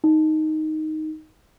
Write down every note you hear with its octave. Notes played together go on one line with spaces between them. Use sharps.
D#4